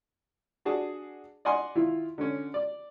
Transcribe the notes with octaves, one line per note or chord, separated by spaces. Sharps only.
D4 F#4 G#4 A5
D5 D#5 F#5 G#5 C6
D#3 E4 F4
D3 C#4
D5